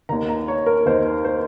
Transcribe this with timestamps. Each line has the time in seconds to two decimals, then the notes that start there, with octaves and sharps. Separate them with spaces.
0.09 D#2 D#3 A#5
0.29 A#5
0.48 C#5
0.66 A#4
0.86 D#2 D#3 C5
1.25 C5